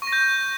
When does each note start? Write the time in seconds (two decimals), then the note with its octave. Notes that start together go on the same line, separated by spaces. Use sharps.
0.02 C#6
0.07 A#6
0.13 G6